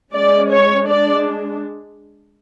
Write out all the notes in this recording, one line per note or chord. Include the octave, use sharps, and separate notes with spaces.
G#3 C#4 D5
C#5
G#3 D4 D5